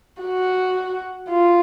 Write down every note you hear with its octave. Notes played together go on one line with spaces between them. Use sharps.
F#4
F4